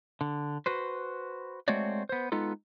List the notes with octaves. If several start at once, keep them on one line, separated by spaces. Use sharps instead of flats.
D3
F#4 B4 C5
G#3 A3 C4 F#4 C#5 D5
B3 C5
G#3 B3 D#4 F4 A4